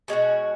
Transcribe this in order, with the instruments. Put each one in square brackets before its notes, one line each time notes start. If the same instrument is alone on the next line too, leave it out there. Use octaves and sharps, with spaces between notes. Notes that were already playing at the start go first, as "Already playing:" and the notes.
[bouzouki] B2 G#3 C#4 F#4